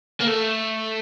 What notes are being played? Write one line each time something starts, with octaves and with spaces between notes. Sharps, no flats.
A#3
A3